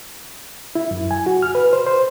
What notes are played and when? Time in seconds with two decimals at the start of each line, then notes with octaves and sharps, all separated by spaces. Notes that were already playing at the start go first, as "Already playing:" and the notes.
0.75 E4
0.91 F#2
1.11 G#5
1.26 F#4
1.42 F6
1.55 B4
1.73 C5
1.86 C5